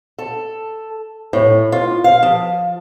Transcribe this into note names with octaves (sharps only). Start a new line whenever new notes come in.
A4
A2
F4
F5
F3